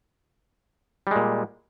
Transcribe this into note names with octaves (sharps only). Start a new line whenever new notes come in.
A#2 G3 G#3